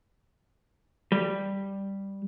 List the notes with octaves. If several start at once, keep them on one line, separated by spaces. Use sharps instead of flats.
G3